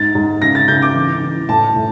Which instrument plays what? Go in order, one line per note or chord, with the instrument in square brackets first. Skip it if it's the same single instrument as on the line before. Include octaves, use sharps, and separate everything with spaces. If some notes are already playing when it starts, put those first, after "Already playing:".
Already playing: [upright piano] G#2 [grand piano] A6
[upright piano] G#2
[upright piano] C#3 [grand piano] A#6
[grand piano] A6
[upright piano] C#3 [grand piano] G6
[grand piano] D6
[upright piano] E3
E3
[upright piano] A2 [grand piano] A5
[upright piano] A2